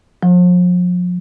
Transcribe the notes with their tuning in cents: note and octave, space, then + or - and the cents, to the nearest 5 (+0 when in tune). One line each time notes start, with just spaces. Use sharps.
F3 +40